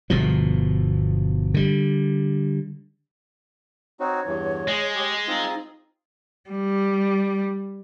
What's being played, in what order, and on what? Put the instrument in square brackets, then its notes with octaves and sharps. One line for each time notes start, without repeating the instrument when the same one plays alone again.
[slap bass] G1 B2 F3
D3 G3
[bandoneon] C4 D#4 F#4 [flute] C#5
[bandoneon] E2 G2 E3
[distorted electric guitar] G#3 [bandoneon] G#4 C6
[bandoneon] G4 G#4
[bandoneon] C4 F4 G#4 [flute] D#4
[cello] G3